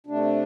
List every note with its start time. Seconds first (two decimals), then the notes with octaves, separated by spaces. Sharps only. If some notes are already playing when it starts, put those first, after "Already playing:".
0.07 C3 A3 D4